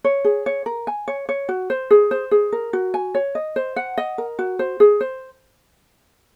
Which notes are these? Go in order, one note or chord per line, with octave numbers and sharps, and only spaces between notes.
C#5
G#4
C#5
A#4
G#5
C#5
C#5
F#4
C5
G#4
C5
G#4
A#4
F#4
G#5
C#5
D#5
C5
F#5
D#5
A#4
F#4
C5
G#4
C5